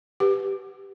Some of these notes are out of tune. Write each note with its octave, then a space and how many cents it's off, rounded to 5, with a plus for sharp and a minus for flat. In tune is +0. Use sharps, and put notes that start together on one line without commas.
G4 +0 B4 +0